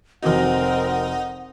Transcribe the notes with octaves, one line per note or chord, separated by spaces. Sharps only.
F1 C4 D#4 F#4 A#4 D#5 F#5